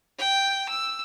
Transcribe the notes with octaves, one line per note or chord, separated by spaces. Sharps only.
G5
E6